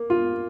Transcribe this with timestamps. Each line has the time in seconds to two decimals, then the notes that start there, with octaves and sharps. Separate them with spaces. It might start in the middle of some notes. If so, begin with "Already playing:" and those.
Already playing: A#3
0.10 F4